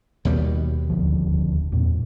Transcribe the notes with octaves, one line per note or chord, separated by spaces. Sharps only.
D#2 B2 G3
F1 D2 F3
E2 G2 A#2